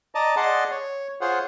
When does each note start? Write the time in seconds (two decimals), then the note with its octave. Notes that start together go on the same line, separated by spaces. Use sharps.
0.15 D5 D#5 A5 A#5 D#6
0.36 G#4 D5 D#5 F#5 A5 C6
0.71 C#5
1.21 F4 G#4 C5 C#5 F#5